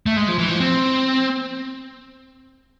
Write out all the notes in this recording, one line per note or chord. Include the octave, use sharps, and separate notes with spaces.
A3
G#3
F3
E3
F3
C4